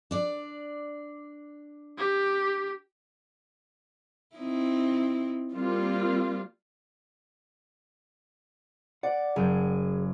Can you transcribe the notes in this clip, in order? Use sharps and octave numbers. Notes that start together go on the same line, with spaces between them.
D4 D5
G4
C4 D#4 E4
G3 A#3 C4 F4
D5 F#5
F#1 G#4 G6